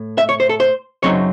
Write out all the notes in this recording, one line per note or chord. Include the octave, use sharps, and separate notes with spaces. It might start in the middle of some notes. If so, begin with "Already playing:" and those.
Already playing: A2
E5
C#5
C5
A4
C5
F#2 C#3 F#3 C4 D#4 C#5